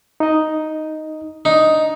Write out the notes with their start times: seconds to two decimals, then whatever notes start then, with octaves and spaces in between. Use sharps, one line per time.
0.20 D#4 D#5
1.45 D4 D#4